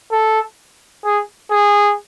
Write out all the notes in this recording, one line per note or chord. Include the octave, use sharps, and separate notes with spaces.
A4
G#4
G#4